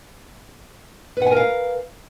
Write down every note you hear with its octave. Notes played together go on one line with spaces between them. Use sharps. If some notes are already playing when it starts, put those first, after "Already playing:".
A#4 B4 F5 F#5 G#5